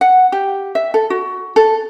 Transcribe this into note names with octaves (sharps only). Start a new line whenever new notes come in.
F#5
G4
E5
A4
F#4
A4